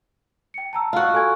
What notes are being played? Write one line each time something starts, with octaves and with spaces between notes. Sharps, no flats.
G5 C#7
A5 A#5 E6
F4 F#4
A4 G#5 G#6